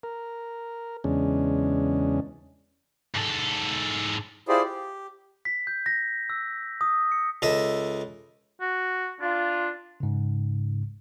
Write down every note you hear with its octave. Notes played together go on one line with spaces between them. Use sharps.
A#4
E2 C#3 G#3 C#4 D4
G#2 A4
E4 F4 G4 G#4 C5 D5
G4
B6
G6
A#6
E6
D#6
C#7
C#2 A4 D#5 E5
F#4
D4 F4
G#2 C#3